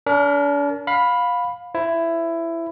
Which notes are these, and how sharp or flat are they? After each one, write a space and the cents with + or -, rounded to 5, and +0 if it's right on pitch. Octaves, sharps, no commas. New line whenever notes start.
D4 -40 A#4 +0
F5 +20 B5 +0
E4 +15 C5 +0